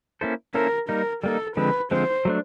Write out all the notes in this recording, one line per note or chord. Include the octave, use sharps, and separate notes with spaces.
A#3 C#4 E4 A4 C5
A#3 C#4 E4 A4 A#4 C5
G3 A#3 D#4 A#4
G3 A#3 D#4 A4
D3 F3 G#3 C4 B4
D3 F3 G#3 C4 C5
F#3 A3 D4